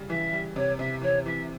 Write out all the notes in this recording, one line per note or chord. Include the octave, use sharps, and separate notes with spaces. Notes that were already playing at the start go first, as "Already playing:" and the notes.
Already playing: C#3 G3
E3 E5
G3
C3 C#5
C3 E5
E3 C#5
E3 E5